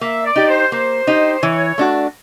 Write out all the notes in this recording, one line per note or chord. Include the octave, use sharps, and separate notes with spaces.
A#3 E5
D5
D#4 G4
C5
A#3 C5
D#4 G4
E3 C#5
A3 D4 F#4